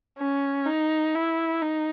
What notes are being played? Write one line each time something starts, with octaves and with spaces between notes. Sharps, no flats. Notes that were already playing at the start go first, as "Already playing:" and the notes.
C#4
D#4
E4
D#4